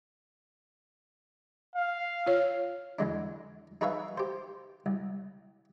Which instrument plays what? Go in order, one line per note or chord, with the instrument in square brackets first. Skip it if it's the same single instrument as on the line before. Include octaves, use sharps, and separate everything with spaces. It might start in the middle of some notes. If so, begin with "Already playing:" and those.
[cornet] F5
[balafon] F4 C#5
[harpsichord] E2 D3 G#3 D4
D#4 G#4 B4 C#5 E5 F5
G4 C5
C2